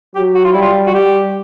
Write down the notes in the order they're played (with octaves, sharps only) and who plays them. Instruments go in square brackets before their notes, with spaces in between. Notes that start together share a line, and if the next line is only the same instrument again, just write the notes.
[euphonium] F#3 [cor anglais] G4
[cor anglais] F#4
F4
[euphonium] G3 [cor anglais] E4
[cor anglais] F4
F#4
[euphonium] G3 [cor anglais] G4